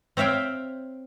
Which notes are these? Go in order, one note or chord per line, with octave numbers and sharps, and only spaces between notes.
C4 C#5 E5 F5 G5